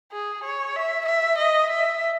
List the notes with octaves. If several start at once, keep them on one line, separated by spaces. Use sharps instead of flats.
G#4
C#5
E5
E5
D#5
E5